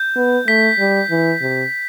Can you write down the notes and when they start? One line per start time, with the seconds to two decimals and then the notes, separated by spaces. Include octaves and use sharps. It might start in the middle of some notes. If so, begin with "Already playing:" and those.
Already playing: G6
0.17 B3
0.47 A3 B6
0.79 G3
1.11 E3
1.42 C3